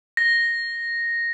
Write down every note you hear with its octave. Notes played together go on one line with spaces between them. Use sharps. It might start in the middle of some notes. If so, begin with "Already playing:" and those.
A#6